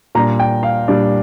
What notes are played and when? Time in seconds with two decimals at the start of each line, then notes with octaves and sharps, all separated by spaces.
0.15 A#2 G3 D4 A#5
0.40 G5
0.63 F5
0.88 A#2 G3 D4